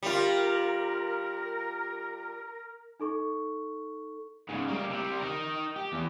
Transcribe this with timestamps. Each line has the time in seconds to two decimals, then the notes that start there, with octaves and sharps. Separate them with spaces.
0.03 G3 F4 A#4
3.00 D#4 A4 C#6
4.49 G#2 C#3
4.68 G3 A#3
4.90 C3 G3
5.19 D#4 A#4
5.76 G4
5.92 E2